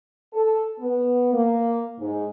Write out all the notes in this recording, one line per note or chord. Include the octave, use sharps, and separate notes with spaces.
A4
B3
A#3
G#2